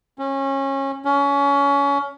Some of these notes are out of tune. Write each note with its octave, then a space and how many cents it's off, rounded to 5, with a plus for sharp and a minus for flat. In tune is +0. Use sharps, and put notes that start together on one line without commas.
C#4 -25
C#4 +25